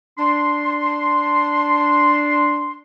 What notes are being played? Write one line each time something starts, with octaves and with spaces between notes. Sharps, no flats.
D4 C6